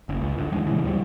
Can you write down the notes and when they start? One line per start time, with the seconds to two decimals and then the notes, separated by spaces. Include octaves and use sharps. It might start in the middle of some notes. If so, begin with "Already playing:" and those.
0.09 F#1
0.21 C#2
0.38 G#2 D3
0.50 E2 F3 G#3
0.67 A#2 C#3 E3
0.84 D#2 F3 G3